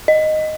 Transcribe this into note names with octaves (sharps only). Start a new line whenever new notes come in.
D#5